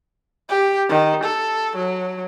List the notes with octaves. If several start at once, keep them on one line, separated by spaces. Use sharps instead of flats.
G4
D#3
A4
F#3